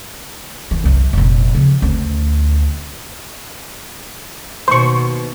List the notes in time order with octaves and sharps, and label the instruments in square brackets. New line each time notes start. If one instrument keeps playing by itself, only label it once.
[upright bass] E3
C2 F#2
F1 A#1
C#3 F3
D2 C#4
[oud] D#2 B2 [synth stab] C5 C#6